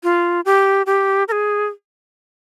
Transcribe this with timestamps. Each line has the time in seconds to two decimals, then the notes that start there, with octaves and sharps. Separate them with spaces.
0.03 F4
0.45 G4
0.86 G4
1.28 A#4
1.32 G#4